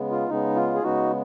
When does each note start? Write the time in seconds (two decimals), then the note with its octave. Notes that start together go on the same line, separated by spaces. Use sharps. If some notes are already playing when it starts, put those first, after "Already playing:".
Already playing: C#3 G#3 B3
0.11 F4
0.29 C#3 G#3 B3 D#4
0.56 F4
0.75 G#4
0.83 C#3 G#3 B3 D#4 F#4